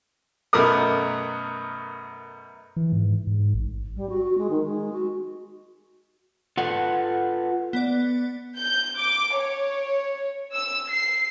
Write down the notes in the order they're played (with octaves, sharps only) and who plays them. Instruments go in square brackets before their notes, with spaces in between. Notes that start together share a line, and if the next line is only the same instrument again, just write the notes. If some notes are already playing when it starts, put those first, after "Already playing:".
[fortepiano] F#2 B2 A3 B3 A#4 D#6
[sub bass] E3
G#2
G#2
A1
[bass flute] G3
F#4
F#4
G#3
D#3
G#3
F#4
[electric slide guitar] F4 A4 B4 F#5
[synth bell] B3 D5
[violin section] G6
D6
C#5
E6
C7